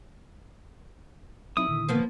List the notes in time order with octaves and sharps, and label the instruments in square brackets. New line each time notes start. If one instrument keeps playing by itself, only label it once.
[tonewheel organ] F#3 C4 D#4 [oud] E4 [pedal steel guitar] D#6
[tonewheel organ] A#2 D3 D#3
[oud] F3 A#3 B3